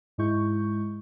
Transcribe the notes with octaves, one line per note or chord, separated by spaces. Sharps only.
G#2 G#3 E4 C#6 G6